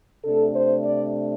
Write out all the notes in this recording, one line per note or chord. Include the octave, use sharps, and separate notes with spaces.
C3 A3 D4 A4
C5
D5